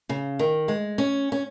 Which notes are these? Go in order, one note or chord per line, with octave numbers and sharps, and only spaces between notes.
C#3
D#3
G#3
C#4
C#4